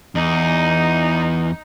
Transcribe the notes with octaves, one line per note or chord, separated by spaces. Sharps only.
E2 D#4